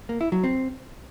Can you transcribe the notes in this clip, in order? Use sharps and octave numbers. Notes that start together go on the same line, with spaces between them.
A#3
E4
F#3
C4